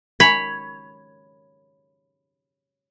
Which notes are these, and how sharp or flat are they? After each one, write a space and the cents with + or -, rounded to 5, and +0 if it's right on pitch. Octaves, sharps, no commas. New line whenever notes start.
C#5 +0 B5 +0